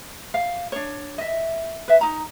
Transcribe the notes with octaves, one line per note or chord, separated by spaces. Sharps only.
F5
D4 C#5
D#5 E5
B4 E5
D#4 A#5